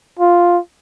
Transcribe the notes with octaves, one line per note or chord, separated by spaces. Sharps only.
F4